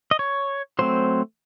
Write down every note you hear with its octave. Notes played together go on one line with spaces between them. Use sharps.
D#5
C#5
F#3 A3 C4 C5